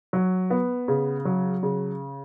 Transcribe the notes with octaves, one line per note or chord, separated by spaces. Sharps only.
F#3
B3
C#3
F#3
C#3